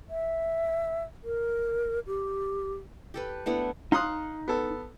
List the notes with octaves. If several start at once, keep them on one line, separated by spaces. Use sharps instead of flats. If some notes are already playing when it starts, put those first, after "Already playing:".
E5
A#4
G4
G4 A4 B4
A3 B3 D4 E4
D#4 F5 C6 D#6 F#6
B3 A4